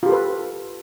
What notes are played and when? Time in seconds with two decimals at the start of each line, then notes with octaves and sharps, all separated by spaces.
0.03 F4
0.06 G4
0.09 A4
0.12 B4